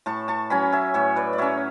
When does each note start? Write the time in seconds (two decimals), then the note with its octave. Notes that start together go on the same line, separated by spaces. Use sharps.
0.06 A2 A5 C#6
0.28 A5 C#6
0.50 F#3 C#4 G#5 B5
0.73 E5 G#5
0.94 A2 C#5 E5
1.16 B4 D5
1.33 D5
1.38 F#3 C#4 C#5 E5